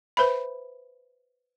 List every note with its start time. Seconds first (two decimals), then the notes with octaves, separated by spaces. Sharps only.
0.17 B4 C5 E5 B5